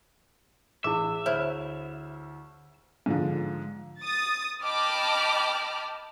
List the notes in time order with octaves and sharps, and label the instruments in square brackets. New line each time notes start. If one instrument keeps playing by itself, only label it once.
[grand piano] A1 [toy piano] E4 G#4 D6 [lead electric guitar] E5
[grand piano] D2 B5 F6 [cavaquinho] E4 [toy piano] C5 C#5
[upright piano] G#2 D3 F3
[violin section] D#6 A6
D#5 G5 A5 B5 D6 F6